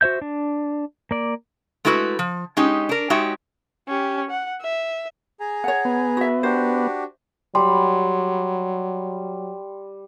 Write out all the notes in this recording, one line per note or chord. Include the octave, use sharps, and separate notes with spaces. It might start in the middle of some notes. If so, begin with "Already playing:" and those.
F#4 C5 E5 G6
D4
A#3 D5
G#3 A3 E4 F#4 A#4 B4
F3
G#3 C#4 D#4 G4
D4 A#4
G#3 D#4 F#4 G4 C#5 E5
C#4 G4
F#5
E5
G#4 G#5 A#5
C#5 F#5
B3
F#4 E5
D4 F#4 G4 C5
F#3 G3 B5 C6